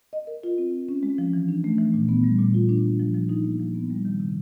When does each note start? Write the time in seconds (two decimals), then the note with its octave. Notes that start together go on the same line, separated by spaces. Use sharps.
0.13 D#5
0.27 A#4
0.44 F4
0.58 C4
0.73 F4
0.89 C#4
1.03 G#3
1.18 F3
1.33 E3
1.49 D4
1.64 A3
1.78 E3
1.94 A#2
2.09 B3
2.24 G3
2.39 A#2
2.54 F4
2.69 D4
2.85 A#3
3.00 F3
3.15 F3
3.29 D#4
3.45 A#3
3.60 F3
3.75 B3
3.90 G3
4.05 D#3
4.20 C3